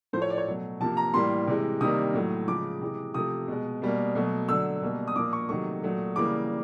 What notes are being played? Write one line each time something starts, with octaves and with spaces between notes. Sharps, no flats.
A2 F3 A3 C5
C#5
D5
C#5
B2 F#3 A3
C3 F3 A#3 A5
A#5
A2 E3 G3 A#3 C6
C3 E3 G#3
C3 D#3 G3 A#3 D#6
A2 F#3 A3
C#3 F3 G#3 D6
C3 E3 G#3
C3 F3 A3 D#6
B2 G#3
B2 G3 A#3
B2 F#3 A3
D3 F#3 A3 E6
B2 G3 A#3
D#6
A#2 F3 A#3 D6
C#6
C3 D#3 F#3 A3 C#6
A#2 F#3 A3
C#3 E3 G3 A#3 D6